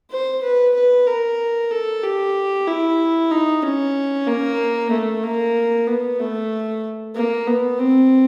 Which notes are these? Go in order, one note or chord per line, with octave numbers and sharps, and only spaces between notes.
C5
B4
B4
A#4
A4
G4
E4
D#4
C#4
A#3
A3
A#3
B3
A3
A#3
B3
C4